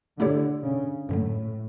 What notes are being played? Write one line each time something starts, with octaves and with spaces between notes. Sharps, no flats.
D3 A3 E4 G4 C#5
C#3
F#2 A2 D3 F#3